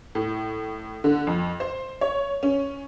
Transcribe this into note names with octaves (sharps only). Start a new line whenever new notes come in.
A2
D3
F2
C5
C#5
C#4